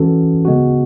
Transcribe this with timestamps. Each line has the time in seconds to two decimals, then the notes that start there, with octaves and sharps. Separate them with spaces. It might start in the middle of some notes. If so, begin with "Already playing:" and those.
Already playing: E3 G#3 C#4 F#4 A4
0.45 C#3 G#3 B3 F#4